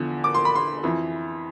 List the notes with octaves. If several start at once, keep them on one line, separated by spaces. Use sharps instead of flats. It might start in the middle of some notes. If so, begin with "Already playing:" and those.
Already playing: E2 D3 F3
D6
C6
B5
C6
F2 E3